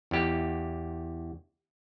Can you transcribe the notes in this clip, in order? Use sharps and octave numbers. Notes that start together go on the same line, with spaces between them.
E2 G4